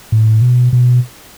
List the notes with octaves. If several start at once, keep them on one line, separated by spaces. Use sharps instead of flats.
A2
B2
B2